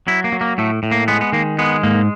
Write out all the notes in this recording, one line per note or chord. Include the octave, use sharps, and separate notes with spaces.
F#3 E4
A#3
F#3
A#3
A2 A3
A2
A#3
G#3 B3
B3
D#3 A#3
G#3 B3
G#2 A#3